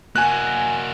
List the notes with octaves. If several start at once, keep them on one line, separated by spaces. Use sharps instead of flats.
A#3 F#4 G#5 F#6